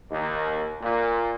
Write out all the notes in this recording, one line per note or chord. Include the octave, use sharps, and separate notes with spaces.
D#2
A#2